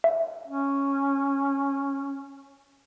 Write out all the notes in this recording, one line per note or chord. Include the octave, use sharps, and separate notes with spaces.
E5
C#4